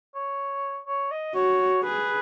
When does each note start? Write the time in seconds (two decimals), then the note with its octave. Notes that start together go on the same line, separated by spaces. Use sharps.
0.15 C#5
0.87 C#5
1.11 D#5
1.35 F#4 C#5
1.83 G#4 B4